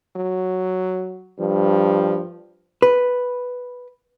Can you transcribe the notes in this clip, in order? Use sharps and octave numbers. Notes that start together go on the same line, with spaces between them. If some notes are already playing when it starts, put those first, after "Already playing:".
F#3
G2 F3
B4